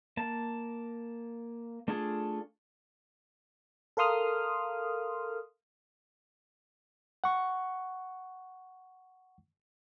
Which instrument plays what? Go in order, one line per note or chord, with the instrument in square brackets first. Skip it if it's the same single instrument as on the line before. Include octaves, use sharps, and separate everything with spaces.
[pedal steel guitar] A#3 A5
A3 D4 F4 G#4 A4
[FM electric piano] A4 A#4 F5 C6 D#6 F6
[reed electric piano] F#5 C#6